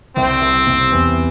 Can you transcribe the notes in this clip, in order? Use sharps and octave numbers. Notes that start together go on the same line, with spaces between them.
C2 C4
C2
C3
E2